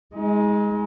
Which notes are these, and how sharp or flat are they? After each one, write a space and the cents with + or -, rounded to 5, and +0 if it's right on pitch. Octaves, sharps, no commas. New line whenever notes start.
G#3 +0 D#4 +40